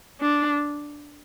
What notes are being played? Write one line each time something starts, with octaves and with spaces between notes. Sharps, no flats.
D4